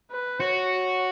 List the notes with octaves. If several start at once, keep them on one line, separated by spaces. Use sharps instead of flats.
B4
F#4 C#5